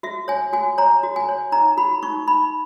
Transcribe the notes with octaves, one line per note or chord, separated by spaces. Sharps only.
F#4 E5
C#5 G#5
F#4 G#5
C#5 A#5
F#4
G#5
C#5
D#4 A#5
F#4 B5
D#4 C#6
D#4 B5